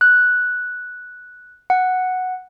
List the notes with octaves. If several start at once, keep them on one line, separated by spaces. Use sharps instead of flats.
F#6
F#5